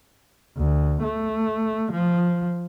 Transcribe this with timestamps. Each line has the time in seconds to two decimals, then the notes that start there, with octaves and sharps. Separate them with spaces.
0.58 D2
1.03 A3
1.92 F3